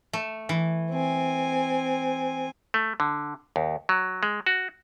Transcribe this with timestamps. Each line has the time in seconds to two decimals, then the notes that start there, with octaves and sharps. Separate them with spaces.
0.13 A3
0.49 E3
0.91 C4 G#5
2.74 A3
3.00 D3
3.56 D#2
3.89 F#3
4.23 G#3
4.46 F#4